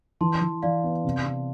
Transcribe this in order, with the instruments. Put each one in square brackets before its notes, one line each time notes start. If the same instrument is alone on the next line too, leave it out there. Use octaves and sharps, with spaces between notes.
[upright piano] E3 [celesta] A5 C6
[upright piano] E3
[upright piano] E3 [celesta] D5 F5
[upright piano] B3
C3
C3